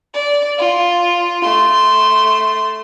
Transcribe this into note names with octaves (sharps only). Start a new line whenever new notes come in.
D5
F4
A3 C6